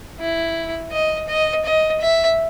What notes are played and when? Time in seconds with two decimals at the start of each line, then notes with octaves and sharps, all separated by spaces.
0.20 E4
0.92 D#5
1.28 D#5
1.65 D#5
2.01 E5